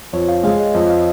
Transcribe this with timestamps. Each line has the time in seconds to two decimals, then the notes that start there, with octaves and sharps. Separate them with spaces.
0.13 F2 C#5
0.29 F5
0.44 G#3 F5
0.60 D#5
0.74 F2 D#5
0.90 F5